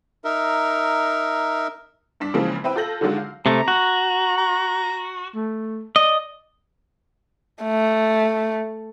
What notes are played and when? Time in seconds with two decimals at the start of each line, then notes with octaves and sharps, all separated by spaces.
0.25 D#4 A#4 E5
2.20 G2 D4 B6
2.34 C#3 E3 F3 G#3 A#3 C4
2.64 C4 E4 B4 G5 E6
2.76 F4 A4 G6 A#6 F#7
3.01 D3 D#3 F#3 G#3 F4 F#4
3.18 F5
3.46 C3 A3 A#5
3.68 F#4
4.38 A#5
5.35 A3
5.96 D5 D#5
7.64 A3